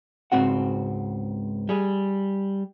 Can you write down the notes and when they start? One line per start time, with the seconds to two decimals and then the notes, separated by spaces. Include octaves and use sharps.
0.32 C#2 G#2 C4 F#4 F#5
1.69 G3 G#4